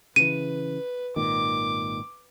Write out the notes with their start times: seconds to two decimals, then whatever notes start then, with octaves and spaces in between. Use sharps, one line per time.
0.16 C#3 E3 B4 D#7
1.16 G#1 A#2 D#3 D6